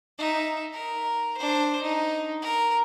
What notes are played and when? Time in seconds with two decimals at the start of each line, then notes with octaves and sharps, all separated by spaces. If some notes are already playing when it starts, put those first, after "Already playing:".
0.18 D#4 E5
0.73 A#4
1.37 D4 C5
1.82 D#4
2.42 A#4